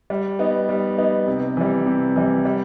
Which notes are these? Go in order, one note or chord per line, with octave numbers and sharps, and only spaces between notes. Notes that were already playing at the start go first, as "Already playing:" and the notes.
G3
B3 D#4
G3
B3 D#4
C3
E3 G3
C3
E3 G3
G3